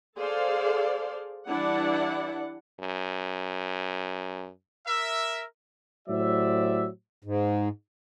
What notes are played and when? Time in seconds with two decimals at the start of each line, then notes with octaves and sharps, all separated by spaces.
0.17 G#4 A4 C5 D5 F5
1.48 E3 G3 D4 E4 D5 F#5
2.80 F#2
4.86 A#4 E5
6.08 A2 F#3 G4 C5 D5 E5
7.24 G#2